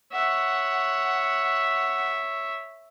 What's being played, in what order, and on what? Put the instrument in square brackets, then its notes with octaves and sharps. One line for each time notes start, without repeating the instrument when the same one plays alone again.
[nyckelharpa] C#5 E5 [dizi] F#5